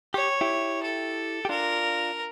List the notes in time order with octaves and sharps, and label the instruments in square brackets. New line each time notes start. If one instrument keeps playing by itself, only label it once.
[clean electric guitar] G4 [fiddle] C#5
[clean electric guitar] E4 G4
[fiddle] A4
[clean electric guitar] G4
[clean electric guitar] D4 F4 [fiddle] A#4